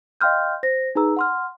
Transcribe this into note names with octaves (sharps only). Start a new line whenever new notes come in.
D#5 F5 G5 C6 F6 G6
C5 A#6
D#4 G#4 B4 A#5 E6
F#5 C6 F6